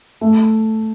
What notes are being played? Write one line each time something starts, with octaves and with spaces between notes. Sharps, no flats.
A3